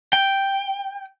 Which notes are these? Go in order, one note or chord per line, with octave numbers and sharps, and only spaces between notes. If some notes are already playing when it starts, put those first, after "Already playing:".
G5